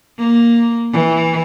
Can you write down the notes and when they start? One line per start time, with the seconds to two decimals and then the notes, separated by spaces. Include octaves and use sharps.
0.18 A#3
0.92 E3